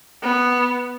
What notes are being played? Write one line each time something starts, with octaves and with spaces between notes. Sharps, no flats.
B3